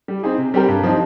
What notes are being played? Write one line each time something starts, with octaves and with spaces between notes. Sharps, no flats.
G3
C4 D#4 G#4
C3
G3 C4 G4 A#4
G2
F3 C4 D#4